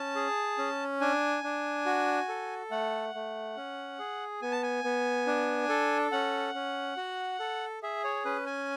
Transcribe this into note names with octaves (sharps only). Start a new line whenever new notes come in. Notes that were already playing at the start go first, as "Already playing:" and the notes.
Already playing: C#4 A5
G#4
C#4
D4 G#5
D4
F#4
A4
A3 F#5
A3
C#4
G#4
B3 G#5
A5
G#5
B3
D4
A4
C#4 F#5
C#4
F#4
A4
G#4 E5
C#5
C#4 B4
G#5